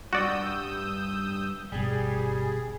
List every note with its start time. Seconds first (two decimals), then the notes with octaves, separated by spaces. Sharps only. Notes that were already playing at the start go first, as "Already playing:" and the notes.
0.13 G2 F#4 D5 D#6 E6 G6
1.72 G1 B2 G3 G#4